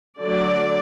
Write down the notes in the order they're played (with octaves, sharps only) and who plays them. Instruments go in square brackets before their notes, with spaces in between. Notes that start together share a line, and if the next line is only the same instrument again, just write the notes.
[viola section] D3 F#3 A3 D5